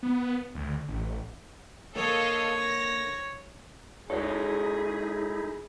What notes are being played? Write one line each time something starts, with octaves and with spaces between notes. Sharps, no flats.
B3
D2
A1
D3 A#3 A4 C#5 D#5 F5
A#6
G#3 D#4 E4 F#4 G#4 A4 C#5